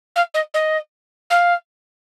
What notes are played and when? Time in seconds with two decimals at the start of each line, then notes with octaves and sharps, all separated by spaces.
0.15 F5
0.34 D#5
0.54 D#5
1.30 F5